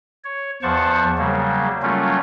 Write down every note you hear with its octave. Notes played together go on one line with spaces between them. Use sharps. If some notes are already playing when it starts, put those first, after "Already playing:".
C#5
E2 F3 C5 F#5 A5 C#6
C#3 F#3 G3 A#3
F#3 G3 A3 A#3 C#4 F4